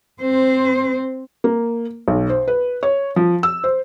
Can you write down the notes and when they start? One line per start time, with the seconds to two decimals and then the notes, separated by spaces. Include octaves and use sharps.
0.22 C4 C5
1.44 A#3
2.08 B1
2.30 C5
2.48 B4
2.83 C#5
3.16 F3
3.43 E6
3.64 C5